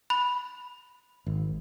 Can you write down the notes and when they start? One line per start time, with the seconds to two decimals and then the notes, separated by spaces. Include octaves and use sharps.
0.10 B5
1.26 G#1